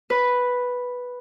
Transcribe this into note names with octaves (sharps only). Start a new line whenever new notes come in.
B4